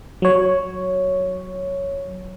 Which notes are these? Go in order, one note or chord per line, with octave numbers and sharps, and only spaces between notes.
F#3 C#5